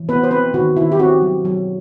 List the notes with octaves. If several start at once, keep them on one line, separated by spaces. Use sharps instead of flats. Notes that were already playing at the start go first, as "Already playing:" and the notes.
Already playing: E3
B3 B4
C5
C4 B4
D#3 F#4
D#3 E4
G4
C4 F#4
F#3
F#3